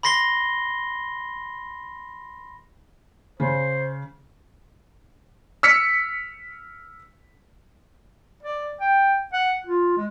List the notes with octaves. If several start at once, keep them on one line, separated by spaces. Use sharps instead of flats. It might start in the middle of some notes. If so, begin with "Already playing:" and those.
B5 C6 A#6 C7 G7
C#3 C5
E6 F6 B6 C#7
D5
G5
F#5
F4
G#3